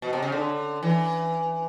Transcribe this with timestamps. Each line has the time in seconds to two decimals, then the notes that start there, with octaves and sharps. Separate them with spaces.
0.02 B2
0.13 C3
0.22 C#3
0.32 D3
0.83 E3